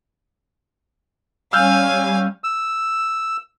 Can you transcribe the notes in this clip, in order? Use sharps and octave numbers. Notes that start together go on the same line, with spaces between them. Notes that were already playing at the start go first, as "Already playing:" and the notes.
G3 C#4 F5 G#5 E6 F6 G6
E6